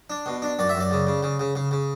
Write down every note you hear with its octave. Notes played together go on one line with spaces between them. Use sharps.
D4
B2
D4
F#2 D5
E5
F#2
D5
C#3
C#3
C#3
C#3
C#3
C#3